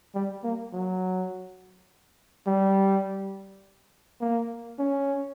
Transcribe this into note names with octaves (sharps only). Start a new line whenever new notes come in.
G3
A#3
F#3
G3
A#3
C#4